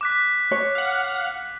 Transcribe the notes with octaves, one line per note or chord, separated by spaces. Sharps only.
D6 F#6 B6
C#5
F5 F#5